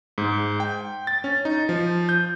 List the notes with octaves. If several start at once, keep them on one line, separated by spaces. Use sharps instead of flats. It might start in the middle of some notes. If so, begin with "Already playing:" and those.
G#2
G5
A6
C#4
D#4
F3
G6